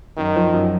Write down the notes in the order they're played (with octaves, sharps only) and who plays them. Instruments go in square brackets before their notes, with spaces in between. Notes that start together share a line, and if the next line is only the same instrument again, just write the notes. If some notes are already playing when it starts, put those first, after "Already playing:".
[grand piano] F#2 [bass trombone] D#3
[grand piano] F3
F#2